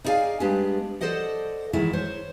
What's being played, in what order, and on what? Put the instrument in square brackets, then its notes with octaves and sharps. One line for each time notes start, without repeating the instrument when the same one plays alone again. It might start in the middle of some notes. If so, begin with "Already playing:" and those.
[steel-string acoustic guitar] D#4 E4 G#4 D5 F5 G#5
G3 G#3 B3 D4 G4
A4 C5 D5 D#5 F#5
D#3 E3 F#3 G#3 E4
C5 C#5